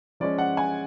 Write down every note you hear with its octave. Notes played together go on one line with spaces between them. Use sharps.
F3 G#3 C#4 D5
F#5
G#5